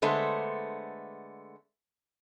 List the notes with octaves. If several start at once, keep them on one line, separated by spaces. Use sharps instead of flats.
D3 G#3 A3 B3 C5